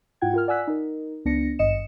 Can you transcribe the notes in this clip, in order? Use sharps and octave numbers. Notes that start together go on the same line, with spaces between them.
G#2 E4 F4 F#5 G5 G#6
F4 A#4 F6
D5 F#5 G#5 E6 F#6 B6
D#4 A#4
C#2 B3 D4 A#6 C#7
G#1 G2 D#5 C#7 E7